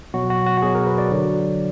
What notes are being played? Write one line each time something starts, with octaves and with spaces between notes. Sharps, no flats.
B2 F#3 F#4
F#4
F#4
F#4
B2 F#3 G#4
A#4
B4
D5
D3 F#3